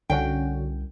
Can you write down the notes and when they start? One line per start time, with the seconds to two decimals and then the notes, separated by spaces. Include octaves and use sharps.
0.10 C2 D3 C#4 F#4 G5